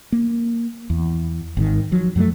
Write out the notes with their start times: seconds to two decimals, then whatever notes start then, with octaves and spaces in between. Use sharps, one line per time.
0.12 A#3
0.90 E2
1.57 G#1 G#2 D#3
1.92 F3 F#3
2.16 F#2 F#3 G3 A3